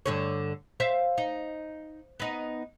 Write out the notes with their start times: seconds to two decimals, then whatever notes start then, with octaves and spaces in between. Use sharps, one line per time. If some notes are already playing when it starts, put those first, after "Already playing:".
0.06 G2 D3 C#5
0.80 C5 E5 F5
1.18 D#4
2.20 B3 D#4